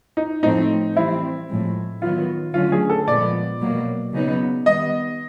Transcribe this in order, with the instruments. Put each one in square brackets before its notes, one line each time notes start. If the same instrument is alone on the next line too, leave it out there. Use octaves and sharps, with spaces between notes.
[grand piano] D#4
[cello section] A2 F3 A3 C4 [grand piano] D#4
[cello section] E3 G3 C4 [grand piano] E4
[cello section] A2 F3 G#3
[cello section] D#3 F#3 B3 [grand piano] F4
[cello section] D3 F#3 A3 C#4 [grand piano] F4
[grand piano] G#4
A4
[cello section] A#2 F3 G#3 B3 [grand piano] D5
[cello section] B2 F#3 A#3
C#3 F#3 B3 D#4
[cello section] D#3 G3 B3 [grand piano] D#5